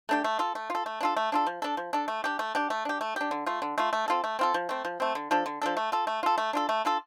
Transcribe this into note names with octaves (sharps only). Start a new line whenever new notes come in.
A3 D4 G4
A3
F4 A4
A3
F4 A4
A3
D4 F4 A4
A3
D4 F4 A4
F3
D4 A4
F3
D4 A4
A3
D4 G4
A3
D4 G4
A3
D4 G4
A3
D4 G4
D3
A3 F4
D3
A3 F4
A3
C4 F4 A4
A3
C4 F4 A4
F3
A3 C4
F3
A3 C4
D3
F3 D4 A4
D3
F3 D4 A4
A3
F4 A4
A3
F4 A4
A3
D4 F4 A4
A3
D4 F4 A4